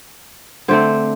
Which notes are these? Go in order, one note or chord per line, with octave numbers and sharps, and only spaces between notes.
D3 A3 C4 C5